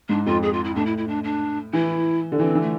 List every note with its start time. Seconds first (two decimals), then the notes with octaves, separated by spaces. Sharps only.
0.09 G#2 D4
0.26 F2 F4
0.43 G#4
0.53 F4
0.64 E4
0.76 A2 D4
0.86 E4
0.98 E4
1.08 D4
1.24 D4
1.73 E3 E4
2.32 D3
2.40 E3 C4
2.55 E3
2.61 A3